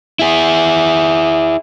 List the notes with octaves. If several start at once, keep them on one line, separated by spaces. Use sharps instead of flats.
E4 G#4